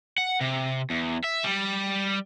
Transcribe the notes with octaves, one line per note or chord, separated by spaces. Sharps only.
F#5
C3
E2
E5
G3